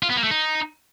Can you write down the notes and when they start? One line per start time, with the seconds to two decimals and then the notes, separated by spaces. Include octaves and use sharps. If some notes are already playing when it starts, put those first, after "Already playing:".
0.03 F4
0.10 B3
0.17 A#3
0.24 A3
0.31 D#4